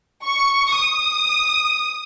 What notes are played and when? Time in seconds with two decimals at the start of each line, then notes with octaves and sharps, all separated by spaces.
0.25 C#6
0.76 D#6